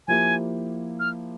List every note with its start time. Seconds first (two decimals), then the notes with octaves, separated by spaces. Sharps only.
0.08 F3 A#3 E4 G4 G#5
1.00 F6